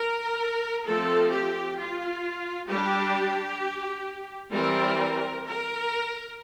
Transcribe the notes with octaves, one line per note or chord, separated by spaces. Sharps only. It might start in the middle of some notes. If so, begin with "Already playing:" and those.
Already playing: A#4
F3 A3 C4 A4
G4
F4
G3 D4 G4
E3 G3 C4 A#4
A#4